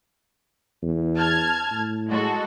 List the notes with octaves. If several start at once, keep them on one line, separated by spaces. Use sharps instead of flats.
E2
A5 F6 G#6
A2
G#3 F#4 A4